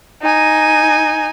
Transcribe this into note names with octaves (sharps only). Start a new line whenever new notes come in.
D#4 G#5